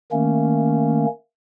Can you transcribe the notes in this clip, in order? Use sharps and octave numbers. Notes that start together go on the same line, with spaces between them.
D#3 A3 A#3 C#4